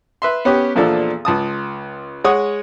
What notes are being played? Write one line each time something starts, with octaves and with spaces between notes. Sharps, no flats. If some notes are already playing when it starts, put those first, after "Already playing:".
B4 E5 C6
B3 C#4 G4
E2 A#2 F3 D4 A4
C#2 A5 D#6
G#3 C#5 F#5 D#6